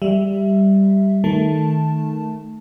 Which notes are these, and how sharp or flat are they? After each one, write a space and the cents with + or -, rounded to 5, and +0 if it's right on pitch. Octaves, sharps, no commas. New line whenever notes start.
G3 +0 E5 +0
D#3 +0 A3 -10 A5 +0